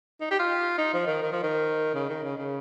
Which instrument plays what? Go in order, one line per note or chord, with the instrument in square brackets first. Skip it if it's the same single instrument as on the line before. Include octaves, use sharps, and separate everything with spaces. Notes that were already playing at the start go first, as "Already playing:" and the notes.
[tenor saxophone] D#4
G4
F4
D#4
F3
D#3
D#3
F3
D#3
C#3
D#3
C#3
C#3